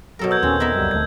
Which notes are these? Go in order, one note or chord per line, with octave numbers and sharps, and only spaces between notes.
B2 F#3 A4 A#4
E6 G6 G#6
D#2 A#2 C4 C#4
B3 D#4 A#4 E5
C#2 F#2 G3
D#1 D2 A3 G#6